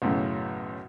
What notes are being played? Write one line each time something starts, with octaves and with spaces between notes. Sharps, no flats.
B1 F#2 A2 C#3